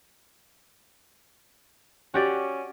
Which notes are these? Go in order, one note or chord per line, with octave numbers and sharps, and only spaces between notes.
C#4 F#4 G4 D5